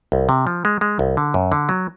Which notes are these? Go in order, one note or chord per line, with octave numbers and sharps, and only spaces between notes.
C2
C3
F3
G#3
G#3
C2
D3
F#2
D3
F#3